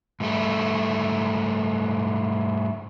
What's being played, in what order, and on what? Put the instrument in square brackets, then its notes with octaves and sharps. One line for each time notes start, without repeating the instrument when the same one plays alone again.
[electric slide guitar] G#2 G3 A3